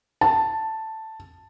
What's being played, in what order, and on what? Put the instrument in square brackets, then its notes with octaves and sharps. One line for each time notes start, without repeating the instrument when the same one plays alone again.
[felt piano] A5